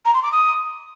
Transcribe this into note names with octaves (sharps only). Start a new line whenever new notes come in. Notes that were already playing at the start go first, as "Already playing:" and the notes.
A#5
C6
D6
D#6